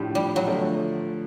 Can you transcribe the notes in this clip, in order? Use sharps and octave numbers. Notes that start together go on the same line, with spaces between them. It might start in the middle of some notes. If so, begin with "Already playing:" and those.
Already playing: A2 F3 A3 D4 G4
G3
F#3
D3 F3 A3